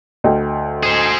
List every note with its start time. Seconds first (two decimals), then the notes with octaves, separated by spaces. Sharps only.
0.24 D2 D#5 G5
0.83 G#4 C5